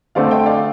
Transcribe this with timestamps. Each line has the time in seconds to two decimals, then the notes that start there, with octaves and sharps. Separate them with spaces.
0.15 D3 A3 C4 D5 F5
0.31 D#5 G5
0.46 D5 F5